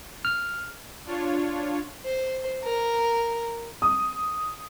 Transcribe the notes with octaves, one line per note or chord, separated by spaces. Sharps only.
F6
D4 F4 C#5
C5
A#4
D#6